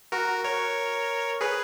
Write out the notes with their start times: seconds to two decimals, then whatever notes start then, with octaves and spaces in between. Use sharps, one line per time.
0.12 F#4 A#4
0.45 A#4 C#5
1.41 G#4 B4